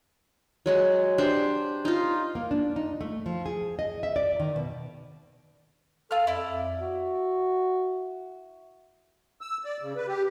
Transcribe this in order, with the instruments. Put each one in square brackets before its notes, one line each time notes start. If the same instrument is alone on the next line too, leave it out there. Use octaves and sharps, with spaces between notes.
[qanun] F#3 G#3 G#4
D4 G4 C5
D#4 F4
[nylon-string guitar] A#3
D4
D#4
A3
F3
G#4
D#5
E5
D5
D#3
B2
[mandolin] F4 F6 [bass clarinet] A4
[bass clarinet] F2 [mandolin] E4 D5
[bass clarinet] F#4
[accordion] E6
D5
C#3
B4
G4